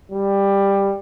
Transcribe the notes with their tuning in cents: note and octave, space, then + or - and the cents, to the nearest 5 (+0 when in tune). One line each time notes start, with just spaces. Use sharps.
G3 +15